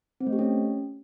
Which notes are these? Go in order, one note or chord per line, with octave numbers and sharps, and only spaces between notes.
C4
A3
G4
C#4